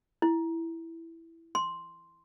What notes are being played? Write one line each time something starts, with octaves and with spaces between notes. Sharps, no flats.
E4
C6